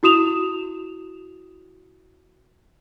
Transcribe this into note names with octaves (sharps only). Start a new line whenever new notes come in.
E4 F#4 D#6 E7 F7